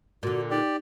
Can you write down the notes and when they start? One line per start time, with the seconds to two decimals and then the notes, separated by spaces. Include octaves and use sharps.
0.23 A#2 D3 F#4
0.51 D#4 G4 D5